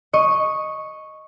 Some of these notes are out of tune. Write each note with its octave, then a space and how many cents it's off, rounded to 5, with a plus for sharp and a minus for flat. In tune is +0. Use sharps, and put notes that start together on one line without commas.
D#5 +0 C#6 -5